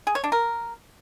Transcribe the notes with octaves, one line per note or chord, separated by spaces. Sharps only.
G#4
C#5
D4
A#4